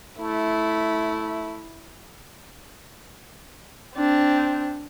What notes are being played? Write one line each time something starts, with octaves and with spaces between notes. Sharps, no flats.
A3 E4
C4 D4